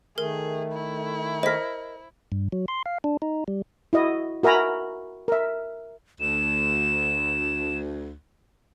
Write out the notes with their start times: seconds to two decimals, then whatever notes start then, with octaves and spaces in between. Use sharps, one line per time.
0.18 D#3 A3 G#4 A#4
0.72 E4
1.43 A#4 C5 D#5 B6
2.32 G2
2.52 F#3
2.68 C6
2.86 F5
3.04 D4
3.22 D#4
3.48 G3
3.93 E4 F#4 D#5
4.43 F#4 A#4 E5 G#5 A#5 B5
5.28 A#4 E5
6.21 D2 E7